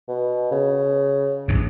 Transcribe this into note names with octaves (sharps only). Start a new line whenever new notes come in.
B2
C#3
A1 G2